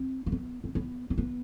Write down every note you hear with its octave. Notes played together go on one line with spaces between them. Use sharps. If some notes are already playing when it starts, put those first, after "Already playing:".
Already playing: C4
A#3
B3
C4
B3
C4
B3